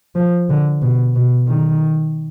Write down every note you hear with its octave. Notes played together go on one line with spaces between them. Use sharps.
F3
D3
B2
B2
D#3